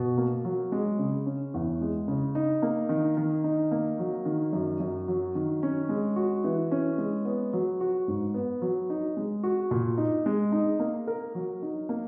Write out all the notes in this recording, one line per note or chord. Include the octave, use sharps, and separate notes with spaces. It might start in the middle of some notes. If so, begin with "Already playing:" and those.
Already playing: B2
A#3
F#3
G#3
C#3
C#4
E2
G#3
C#3
D#4
A#3
D#3
D#3
D#4
A#3
F#3
D#3
F#2
F#2
F#3
D#3
C#4
G#3
F#4
E3
C#4
G#3
B3
F#3
F#4
G#2
B3
F#3
D#4
G#3
F#4
A#2
D#4
G#3
D#4
A#3
A#4
F#3
D#4
A#3